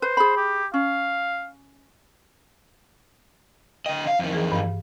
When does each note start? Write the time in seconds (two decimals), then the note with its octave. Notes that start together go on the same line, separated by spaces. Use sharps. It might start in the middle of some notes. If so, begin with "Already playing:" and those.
0.02 B4 C5
0.17 G#4 B5
0.37 G4
0.74 C#4 F5
3.86 D3 D#5 G5
4.07 F5
4.19 F2 D#3
4.33 E3 G#4
4.52 G2 F5